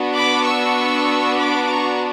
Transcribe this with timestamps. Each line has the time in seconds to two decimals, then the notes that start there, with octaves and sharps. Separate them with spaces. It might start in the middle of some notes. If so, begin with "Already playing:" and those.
Already playing: B3 D4 F#4
0.14 B5 D6
0.45 C#6 E6
1.38 B5 D6
1.70 A#5 C#6